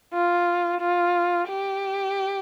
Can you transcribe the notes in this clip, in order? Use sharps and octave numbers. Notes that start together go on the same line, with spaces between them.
F4
F4
G4